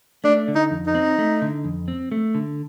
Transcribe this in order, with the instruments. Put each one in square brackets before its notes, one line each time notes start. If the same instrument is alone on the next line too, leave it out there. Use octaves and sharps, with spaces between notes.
[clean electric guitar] A3 [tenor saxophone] D4
[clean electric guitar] D3
[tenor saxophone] D#4
[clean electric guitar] F2
[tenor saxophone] D#4
[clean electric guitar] C4
A3
D3
F2
C4
A3
D3